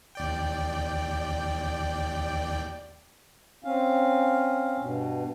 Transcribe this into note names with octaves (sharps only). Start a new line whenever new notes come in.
D#2 D5 G5
C4 C#4 F5
G2 B2